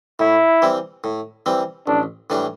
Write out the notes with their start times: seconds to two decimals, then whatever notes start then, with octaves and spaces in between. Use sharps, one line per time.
0.19 A2 E4
0.62 E3 G3 C4
1.04 A2
1.46 E3 G3 C4
1.87 A1 D4
2.30 A2 E3 G3 D4